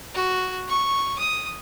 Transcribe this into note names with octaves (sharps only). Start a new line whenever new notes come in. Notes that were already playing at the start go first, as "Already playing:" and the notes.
F#4
C#6
D#6